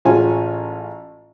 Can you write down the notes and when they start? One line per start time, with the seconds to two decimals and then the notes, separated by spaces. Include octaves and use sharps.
0.05 A1 G#3 C#4 F4 F#4 G#5